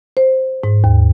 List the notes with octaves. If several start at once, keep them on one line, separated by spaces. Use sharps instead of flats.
C5
G#2
D#2